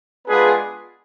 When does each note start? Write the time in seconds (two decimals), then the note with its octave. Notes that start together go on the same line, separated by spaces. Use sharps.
0.28 G#3 B3 D4 F4 G#4 B4